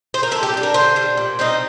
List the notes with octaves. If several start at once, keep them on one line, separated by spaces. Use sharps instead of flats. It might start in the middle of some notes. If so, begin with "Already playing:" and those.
C5
A#4
D3 A4
G4
G3 D4
A#4
D3 C5
G3 D4
A#2
G3 C4 D#4